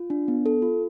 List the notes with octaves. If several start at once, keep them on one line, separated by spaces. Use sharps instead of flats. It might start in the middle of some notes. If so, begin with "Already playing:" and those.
Already playing: F4
D4
B3
A4
F4